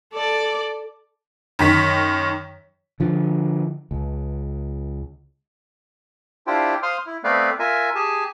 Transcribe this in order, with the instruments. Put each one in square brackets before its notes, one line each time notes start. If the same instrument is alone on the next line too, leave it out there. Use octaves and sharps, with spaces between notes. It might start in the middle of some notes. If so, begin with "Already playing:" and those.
[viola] A4 D5
[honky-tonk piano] F#2 D#3 B6
[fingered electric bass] D3 F3
C#2
[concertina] D4 E4 F4 G4 C5 G5
C5 F5 C6 D#6 F6
E4
A3 B3 C4 B4 D5 F5
F4 A#4 E5 G#5
G4 G#4 G#5 A5